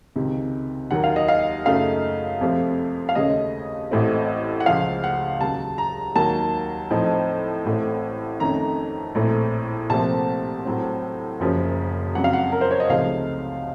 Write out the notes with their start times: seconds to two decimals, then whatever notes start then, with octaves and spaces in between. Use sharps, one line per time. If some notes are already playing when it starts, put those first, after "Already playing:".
0.16 C#2 C3 D#3
0.91 D#2 D#3 F#3 A#3 F#5
1.04 F5
1.16 D#5
1.28 F5
1.66 F#2 C#3 A3 D#4 F5
2.41 F2 C3 F3 A3
3.09 F5
3.15 D#2 C#3 A3 C#4 D#5
3.91 A1 A2 A3 C4
4.60 F#5
4.66 C#2 C#3 F3 F5
5.04 F#5
5.40 D#2 C#3 F#3 A5
5.78 A#5
6.16 D#2 D#3 F#3 A#3 A5
6.90 A2 F3 C4 D#4
7.65 A1 A2 A3 C4
8.40 F2 D#3 A3 C#4 A#5
9.15 A#1 A2 A3 C4
9.90 C2 A#2 F3 A3 C4 A5
10.65 A2 F#3 C4
11.40 F#1 F#2 C#3 F3
12.15 F2 C#3 F#3 F#5
12.24 F5
12.33 F#5
12.52 A#4
12.61 C5
12.71 C#5
12.80 D#5
12.89 C#2 C3 F3 A3 D#4 F5